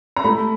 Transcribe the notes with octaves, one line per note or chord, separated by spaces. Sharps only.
A#5
A3 B5